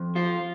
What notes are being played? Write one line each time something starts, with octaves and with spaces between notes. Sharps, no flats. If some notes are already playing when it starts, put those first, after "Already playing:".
Already playing: F2
F3 F4